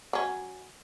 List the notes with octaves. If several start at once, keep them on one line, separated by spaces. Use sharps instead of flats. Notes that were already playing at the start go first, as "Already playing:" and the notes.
F#3 C#4